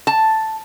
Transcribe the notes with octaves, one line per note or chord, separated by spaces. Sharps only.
A5